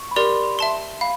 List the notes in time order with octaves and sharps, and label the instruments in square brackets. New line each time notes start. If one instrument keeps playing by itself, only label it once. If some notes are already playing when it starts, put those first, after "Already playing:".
Already playing: [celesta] C#6
B5
[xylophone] G4 A#4 D5 [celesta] C6
[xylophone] E5 A5 C6
[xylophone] F5 [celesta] B5